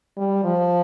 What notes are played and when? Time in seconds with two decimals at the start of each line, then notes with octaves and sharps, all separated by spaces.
0.17 G3
0.44 F3